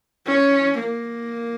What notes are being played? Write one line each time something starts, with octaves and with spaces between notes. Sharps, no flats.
C#4
A#3